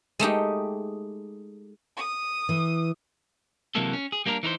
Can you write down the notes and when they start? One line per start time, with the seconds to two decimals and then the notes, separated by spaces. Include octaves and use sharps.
0.19 G#3 A3 D#4 G4
1.97 D#6
2.49 E3
3.75 C3 E3 F#3 G#3 A#3 A4
3.93 C#4
4.12 G#4
4.26 G3 A#3 D4 G4 A#4
4.43 E3 D#4 A#4 C5